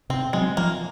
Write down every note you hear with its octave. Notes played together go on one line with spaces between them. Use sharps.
C3 C4
F#3 G#3 C4
F3 A#3